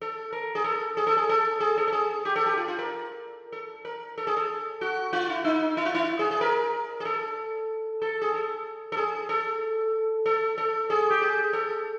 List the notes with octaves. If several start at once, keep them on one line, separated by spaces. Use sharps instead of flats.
A4
A#4
G#4
A4
G#4
A4
G#4
A4
G#4
A4
A4
G#4
G4
A4
G4
F4
F4
A#4
A4
A#4
A4
G#4
A4
F#4
F4
E4
D#4
E4
F4
E4
G#4
G#4
A#4
G#4
A4
A4
G#4
A4
A4
G#4
A4
A4
A4
G#4
G4
G#4
A4